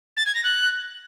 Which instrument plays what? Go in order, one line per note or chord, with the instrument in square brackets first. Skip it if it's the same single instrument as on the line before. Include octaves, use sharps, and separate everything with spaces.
[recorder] A6
G#6
A#6
F#6